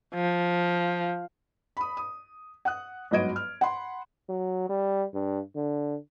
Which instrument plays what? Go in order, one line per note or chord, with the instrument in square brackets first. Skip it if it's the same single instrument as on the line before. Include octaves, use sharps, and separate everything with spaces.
[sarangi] F3
[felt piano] B5 D#6
D#6
F#5 D#6 F#6
G1 G#2 F#3 D#5 G#6 D7
F6
F#5 B5 C6
[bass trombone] F#3
G3
G2
D3